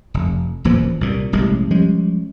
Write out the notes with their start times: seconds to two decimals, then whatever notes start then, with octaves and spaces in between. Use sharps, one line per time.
0.14 F1
0.65 D#1 A#2 E3 F3
1.01 C2 A#2
1.32 E1 A1 G3 G#3
1.70 F3 G3 G#3 C#4